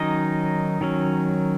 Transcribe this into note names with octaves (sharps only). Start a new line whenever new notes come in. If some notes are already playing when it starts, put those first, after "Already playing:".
Already playing: D#3 F#3 C#4 D#4 D#5
D#3 F#3 C#4